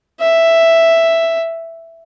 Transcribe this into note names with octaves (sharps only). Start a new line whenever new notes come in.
E5